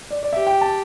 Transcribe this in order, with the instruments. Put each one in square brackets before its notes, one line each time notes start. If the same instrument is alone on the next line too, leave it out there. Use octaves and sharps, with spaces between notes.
[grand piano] D5
D5
[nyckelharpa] G4 [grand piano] E5
[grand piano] G5
A5